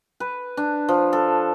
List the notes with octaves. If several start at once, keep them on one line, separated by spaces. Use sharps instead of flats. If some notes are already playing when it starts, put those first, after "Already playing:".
B4
D4
F3
A4